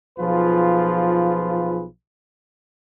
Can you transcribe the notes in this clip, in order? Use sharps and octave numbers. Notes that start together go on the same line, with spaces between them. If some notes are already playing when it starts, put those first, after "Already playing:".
B1 F3 F4 G#4 B4